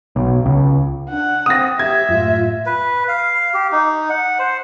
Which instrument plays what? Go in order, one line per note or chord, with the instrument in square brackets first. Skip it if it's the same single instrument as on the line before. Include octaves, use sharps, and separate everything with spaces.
[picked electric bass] B1
C#2
[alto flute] D4 [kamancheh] F#5
[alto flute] C4 [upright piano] D#6 A#6
[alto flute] G4 [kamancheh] E5 [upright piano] G#6
[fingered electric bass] F#2 A2 [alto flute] F4
[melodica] B4
F5
G4
D#4
F#5
C5